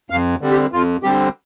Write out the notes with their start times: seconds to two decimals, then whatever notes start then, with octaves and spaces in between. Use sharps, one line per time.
0.10 F2 F5
0.41 D3 G3 C4
0.51 G4
0.72 F2 F4
1.03 D3 G3 C4 G4